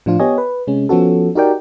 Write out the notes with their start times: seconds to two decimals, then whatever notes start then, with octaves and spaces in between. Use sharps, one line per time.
0.06 A2 F3 D4 F4
0.19 B3 G4 C#5 D#5 G#5
0.38 B4
0.67 C3 G#3 C#4
0.89 F3 B3 C#4 F#4 A4
1.35 D#4 F#4 G4 A#4 D5 G5